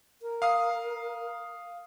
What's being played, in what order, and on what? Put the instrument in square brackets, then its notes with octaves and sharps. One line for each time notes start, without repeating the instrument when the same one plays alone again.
[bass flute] A#4
[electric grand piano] F5 D#6 C7